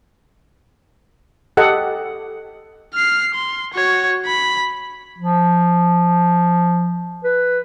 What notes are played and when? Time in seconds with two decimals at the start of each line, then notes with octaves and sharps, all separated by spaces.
1.57 G4 A4 D#5 F#5
2.94 F6 C7
3.34 C6
3.73 F#4 C#5
4.26 B5
5.18 F3
7.24 B4